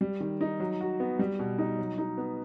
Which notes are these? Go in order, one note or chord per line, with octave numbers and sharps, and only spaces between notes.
G3
D#3
D#4
F#3
F#4
B3
G3
B2
D#4
F#3
D#4
B3